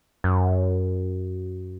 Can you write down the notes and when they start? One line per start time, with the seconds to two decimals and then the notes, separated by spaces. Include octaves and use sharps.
0.24 F#2